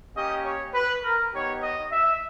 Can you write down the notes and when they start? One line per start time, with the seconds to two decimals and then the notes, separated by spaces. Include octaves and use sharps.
0.15 A#3 C#4 G4 D#5
0.44 C#5
0.74 B4
1.03 A#4
1.33 B3 D#4 G4 C#5
1.62 D#5
1.91 E5